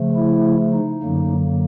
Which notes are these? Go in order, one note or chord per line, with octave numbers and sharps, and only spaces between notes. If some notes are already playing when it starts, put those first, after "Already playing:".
Already playing: C#3 F3 A3
E4
D#4
F#2 D3 F#3 A#3